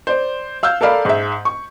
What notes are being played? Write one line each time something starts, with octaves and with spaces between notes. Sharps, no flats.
C5 D5
F5 E6 F6 G6
A4 A#4 D5 F5 B5
G#2 E5
C#6